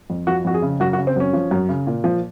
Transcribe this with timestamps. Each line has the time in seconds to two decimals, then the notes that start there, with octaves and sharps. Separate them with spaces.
0.10 F2
0.27 F3 F#4
0.45 F2 F#4
0.54 G#4
0.62 C#3
0.80 F#2 F#4
0.93 F#4
0.98 C#3
1.07 C4
1.16 F#2 C#4
1.33 F3
1.51 F#2
1.69 C#3
1.87 A#2
2.04 F3